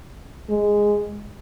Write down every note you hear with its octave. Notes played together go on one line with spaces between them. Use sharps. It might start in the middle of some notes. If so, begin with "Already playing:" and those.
G#3